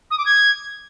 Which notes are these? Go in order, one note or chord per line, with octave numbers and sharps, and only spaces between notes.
D#6
D6
G#6